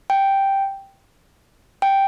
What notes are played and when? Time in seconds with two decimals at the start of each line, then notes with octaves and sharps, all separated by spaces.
0.10 G5
1.82 G5